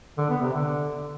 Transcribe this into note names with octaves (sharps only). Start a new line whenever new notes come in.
D3
B3
C3
D3